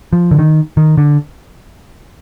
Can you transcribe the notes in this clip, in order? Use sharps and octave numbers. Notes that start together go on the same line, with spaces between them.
F3
D3
D#3
D#3
D3